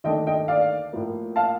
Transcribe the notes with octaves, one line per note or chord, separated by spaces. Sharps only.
D#2 D3 A3 D4 D#5 G5
D#5 G5
D5 F5
A2 F3 A#3
F5 A5